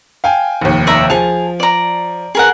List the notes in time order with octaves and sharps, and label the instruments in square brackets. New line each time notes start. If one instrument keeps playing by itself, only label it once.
[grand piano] F5 G5 G#5
F1 D#2
[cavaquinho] D5 E5 A#5
[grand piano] F3 F7 [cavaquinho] G#4 A5
[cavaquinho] D5 A#5
G#4 A#4 F#5